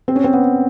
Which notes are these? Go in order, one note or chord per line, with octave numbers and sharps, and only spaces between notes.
C4
C#4
C4
B3